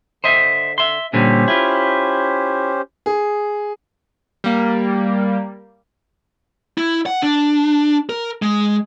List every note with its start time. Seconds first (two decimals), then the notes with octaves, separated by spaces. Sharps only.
0.24 D3 C5 D#5 E5
0.78 E5 C6
1.13 A#2 D3 G3 C#4 G4 C5
1.48 E4 F4
3.06 G#4
4.44 G3 A#3
6.78 E4
7.06 F#5
7.22 D4
8.09 A#4
8.42 G#3